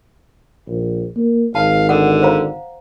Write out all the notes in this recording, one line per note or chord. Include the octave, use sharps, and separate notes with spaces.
A#1
A#3
G#1 F5 A5
D3 F#5
C5 F5 A#5